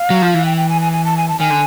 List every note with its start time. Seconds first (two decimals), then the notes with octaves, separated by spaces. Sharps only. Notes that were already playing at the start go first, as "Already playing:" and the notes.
Already playing: F5
0.10 F#3
0.22 F3
0.34 E3
0.45 G5
0.57 G5
0.69 G#5
0.81 G#5
0.93 G#5
1.05 A5
1.17 G#5
1.28 A5
1.39 D#3 G#5
1.50 D3